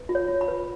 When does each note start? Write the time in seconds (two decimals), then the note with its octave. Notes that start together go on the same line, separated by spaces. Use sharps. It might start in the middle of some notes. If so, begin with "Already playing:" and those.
Already playing: B4
0.09 F4
0.15 C#5
0.29 F4
0.41 B5
0.48 B4